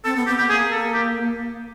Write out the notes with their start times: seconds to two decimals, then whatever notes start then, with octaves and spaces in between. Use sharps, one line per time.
0.05 C4 A4
0.16 B3
0.27 B3 G4
0.38 B3 G4
0.49 A#3 G#4
0.72 A4
0.94 G4